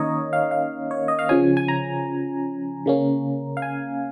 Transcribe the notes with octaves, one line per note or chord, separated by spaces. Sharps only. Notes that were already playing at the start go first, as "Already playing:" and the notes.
Already playing: D#3 A#3 C#4 A#4 C#5 D#5
F5
F5
C#5
D#5
F5
C#3 F3 C#4 G#5
G#5
A#5
C#3 A#3 C#4
F5
G#5